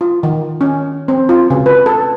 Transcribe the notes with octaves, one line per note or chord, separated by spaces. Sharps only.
F4
D#3
C#4
C4
F4
C#3
B4
A4